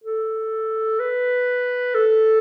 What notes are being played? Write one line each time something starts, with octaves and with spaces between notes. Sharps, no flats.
A4
B4
A4